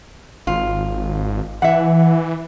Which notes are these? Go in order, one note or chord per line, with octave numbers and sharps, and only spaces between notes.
G#1 F4
E3 E5 F#5